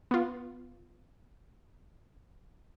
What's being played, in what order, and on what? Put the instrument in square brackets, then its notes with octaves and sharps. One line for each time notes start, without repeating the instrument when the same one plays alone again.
[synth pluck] B3 F4